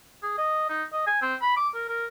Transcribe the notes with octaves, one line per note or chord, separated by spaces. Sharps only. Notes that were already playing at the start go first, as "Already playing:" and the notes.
G#4
D#5
D#4
D#5
G#5
C4
B5
D6
A#4
A#4